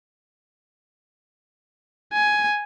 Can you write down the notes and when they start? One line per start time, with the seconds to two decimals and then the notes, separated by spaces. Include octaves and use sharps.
2.13 G#5